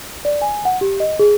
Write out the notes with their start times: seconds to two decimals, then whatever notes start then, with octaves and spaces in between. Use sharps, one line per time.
0.25 D5
0.42 G#5
0.65 F#5
0.81 G4
1.00 D#5
1.19 G#4